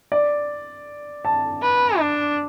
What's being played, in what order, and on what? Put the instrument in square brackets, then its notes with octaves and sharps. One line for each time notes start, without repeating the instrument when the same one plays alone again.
[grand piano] D5
A5
[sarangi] B4
D4